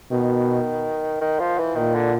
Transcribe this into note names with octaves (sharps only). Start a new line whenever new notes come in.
B2 D#3
D#3
F3
E3
A#2 D#3
D3